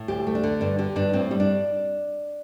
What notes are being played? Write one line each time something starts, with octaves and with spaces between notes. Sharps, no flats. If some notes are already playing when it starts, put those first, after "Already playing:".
Already playing: A2
D2 G4
A3
D4
D3
G2 D4
D3 G4
G2 D4
A2 C4
G3
D4